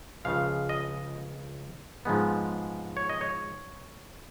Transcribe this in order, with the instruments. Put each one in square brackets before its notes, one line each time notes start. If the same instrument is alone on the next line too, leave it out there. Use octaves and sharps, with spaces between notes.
[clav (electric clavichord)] C#2 C#3 F3 G#3 F5
D#5
G#2 F3 G#3 B3
C#5
D#5
C#5